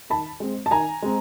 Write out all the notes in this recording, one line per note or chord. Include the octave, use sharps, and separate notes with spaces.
D#3 A5 B5
G#3 C4
A5
D#3 G#5 A#5
G#3 C4